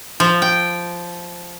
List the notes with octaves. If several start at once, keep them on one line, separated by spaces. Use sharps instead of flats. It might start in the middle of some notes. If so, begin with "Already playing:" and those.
F3
G5